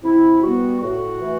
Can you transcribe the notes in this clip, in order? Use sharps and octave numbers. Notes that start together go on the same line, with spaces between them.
C3 E4
G3 B3 F#4
A2 F#4
E3 A3